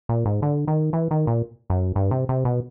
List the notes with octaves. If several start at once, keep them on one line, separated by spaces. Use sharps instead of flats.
A#2
G#2
D3
D#3
E3
D#3
A#2
F#2
G2
C3
C3
B2